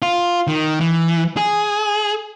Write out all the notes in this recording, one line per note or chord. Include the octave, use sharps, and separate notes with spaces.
F4
D#3
E3
G#4